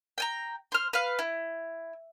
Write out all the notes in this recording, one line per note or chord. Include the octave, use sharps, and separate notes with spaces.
G5 G#5 A#5
C5 F6
B4 F5
E4